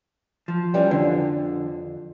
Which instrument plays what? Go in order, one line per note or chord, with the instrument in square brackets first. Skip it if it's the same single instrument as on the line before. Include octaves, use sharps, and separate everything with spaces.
[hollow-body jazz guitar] F3
[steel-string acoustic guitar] E3 G3 C#4
[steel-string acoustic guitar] F2 [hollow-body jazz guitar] D3